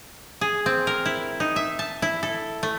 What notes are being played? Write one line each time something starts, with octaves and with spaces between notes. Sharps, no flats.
G#4
C4
A#4
E4
D#4
E5
A5
E4
A4
A3